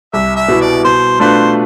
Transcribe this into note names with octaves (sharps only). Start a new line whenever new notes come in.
C2 E5
E5
B2 B3 E4
D5
B2 C5
A3 D4 F4 B4 C5